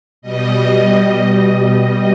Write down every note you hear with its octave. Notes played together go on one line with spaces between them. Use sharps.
B2 G3 D#5
D#5